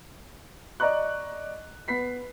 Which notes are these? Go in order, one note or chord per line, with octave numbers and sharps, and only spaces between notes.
D5 D#5 A#5 C#6 F#6
B3 B4 B6 C7